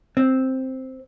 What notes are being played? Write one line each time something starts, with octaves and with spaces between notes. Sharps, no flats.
C4